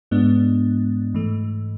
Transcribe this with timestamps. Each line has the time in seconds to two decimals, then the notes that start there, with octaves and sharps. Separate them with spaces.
0.11 G#2 G#3 B3 D4
1.14 G#2 E3 A3